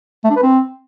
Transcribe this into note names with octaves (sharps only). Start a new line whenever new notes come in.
A3
D4
B4
C4